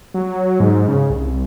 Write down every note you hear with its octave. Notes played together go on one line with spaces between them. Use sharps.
F#3
G#2
C#3
C2